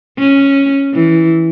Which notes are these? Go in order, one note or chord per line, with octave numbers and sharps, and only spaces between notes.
C#4
E3